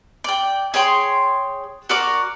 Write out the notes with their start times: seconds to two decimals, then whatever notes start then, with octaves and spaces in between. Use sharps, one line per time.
0.24 D5 G5
0.74 G#4 C#5 G5 C6
1.89 F#4 A#4 D5 D6